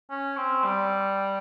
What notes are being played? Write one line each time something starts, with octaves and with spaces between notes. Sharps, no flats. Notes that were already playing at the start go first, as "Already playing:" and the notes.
C#4
C4
G3